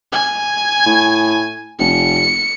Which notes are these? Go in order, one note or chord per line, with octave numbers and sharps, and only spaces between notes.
G#5
A2
F1 C#7